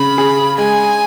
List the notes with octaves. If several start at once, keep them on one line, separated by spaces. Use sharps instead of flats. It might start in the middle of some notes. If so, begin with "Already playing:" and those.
Already playing: C#3 B5
G#4
G#3 G#5